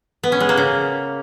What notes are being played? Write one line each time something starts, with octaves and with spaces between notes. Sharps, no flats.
B3
C#4
G#3
A#3
C#3